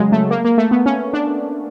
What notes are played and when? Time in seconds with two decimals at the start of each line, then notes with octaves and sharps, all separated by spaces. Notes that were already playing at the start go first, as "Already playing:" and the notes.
Already playing: C#3 F#3 G#3
0.12 A3
0.31 A#3
0.45 A#3
0.58 A3
0.71 B3
0.86 C#4
1.13 D4